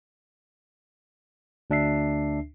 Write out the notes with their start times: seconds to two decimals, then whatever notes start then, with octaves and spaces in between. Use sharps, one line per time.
1.70 D2 D4 E5 C7